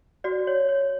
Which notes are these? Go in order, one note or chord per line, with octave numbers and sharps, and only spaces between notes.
F#4 D5
C#5
C#5